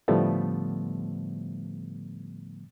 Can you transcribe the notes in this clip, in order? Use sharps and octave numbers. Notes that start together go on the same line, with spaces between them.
A2 D3 F3 G3 A3 B3